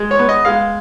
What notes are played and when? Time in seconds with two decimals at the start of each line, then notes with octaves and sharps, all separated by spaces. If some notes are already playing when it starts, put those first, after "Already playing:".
Already playing: G#3
0.11 C#5
0.19 B3
0.29 D#5
0.45 G#3 F5